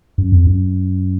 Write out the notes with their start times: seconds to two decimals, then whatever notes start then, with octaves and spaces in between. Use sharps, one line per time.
0.18 F#2
0.32 F2
0.47 F#2